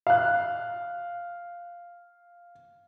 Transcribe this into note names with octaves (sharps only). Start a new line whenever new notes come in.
F5 F#6